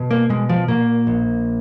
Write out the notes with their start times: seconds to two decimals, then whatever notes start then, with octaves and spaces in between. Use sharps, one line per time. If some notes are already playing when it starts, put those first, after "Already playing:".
Already playing: B2
0.11 A#3
0.29 B2 G#3
0.49 F3
0.68 A#2 A#3
1.07 A#1